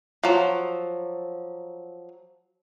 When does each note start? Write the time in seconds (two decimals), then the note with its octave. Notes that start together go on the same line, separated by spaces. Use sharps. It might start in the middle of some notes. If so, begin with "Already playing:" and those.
0.24 F3 F#3